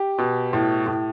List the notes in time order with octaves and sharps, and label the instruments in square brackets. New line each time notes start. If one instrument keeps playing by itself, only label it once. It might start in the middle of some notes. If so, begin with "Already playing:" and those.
Already playing: [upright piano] G4
B2
A2
A2